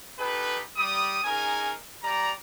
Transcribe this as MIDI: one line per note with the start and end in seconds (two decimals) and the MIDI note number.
0.18 0.59 63
0.18 0.59 67
0.18 0.59 69
0.18 0.59 71
0.77 1.17 55
0.77 1.17 87
1.24 1.71 61
1.24 1.71 63
1.24 1.71 68
1.24 1.71 70
1.24 1.71 80
2.03 2.31 55
2.03 2.31 74
2.03 2.31 82